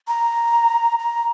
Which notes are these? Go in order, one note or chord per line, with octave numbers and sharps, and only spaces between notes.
A#5
A#5